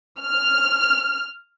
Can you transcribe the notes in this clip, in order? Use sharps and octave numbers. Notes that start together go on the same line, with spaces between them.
F6